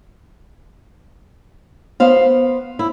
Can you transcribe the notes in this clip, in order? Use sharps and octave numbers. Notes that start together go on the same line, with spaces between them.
B3 C5 F5
E4